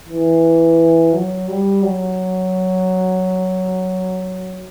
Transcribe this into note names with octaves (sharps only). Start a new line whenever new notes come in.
E3
F#3
G3
F#3